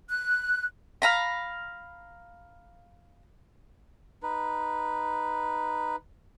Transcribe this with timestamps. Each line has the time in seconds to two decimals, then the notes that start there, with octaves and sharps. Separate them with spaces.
0.09 F#6
1.02 F5 A#5 B5
4.23 D#4 B4